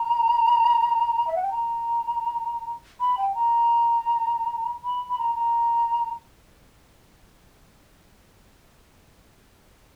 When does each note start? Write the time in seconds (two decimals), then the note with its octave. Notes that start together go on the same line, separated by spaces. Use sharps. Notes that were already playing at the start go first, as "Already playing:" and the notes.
Already playing: A#5
1.27 E5
1.35 F#5
1.43 G5
1.51 A#5
3.01 B5
3.18 G5
3.35 A#5
4.84 B5
5.10 B5
5.18 A#5
5.35 A#5